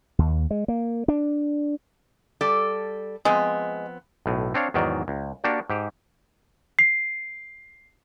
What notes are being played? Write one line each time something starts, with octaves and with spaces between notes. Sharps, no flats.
D#2
G#3
A#3
D4
G3 A4 D5
F3 G#3 B3 C4
B1 A2
C4 D4 C#5 F5
E2 G#2 D#3 F#3 D5
C#2
A#3 D4 F#4 G4 D5
G#2 G4
C7